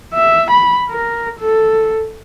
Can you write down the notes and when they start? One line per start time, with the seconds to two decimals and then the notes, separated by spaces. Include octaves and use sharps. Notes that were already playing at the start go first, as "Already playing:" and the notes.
0.14 E5
0.51 B5
0.90 A#4
1.39 A4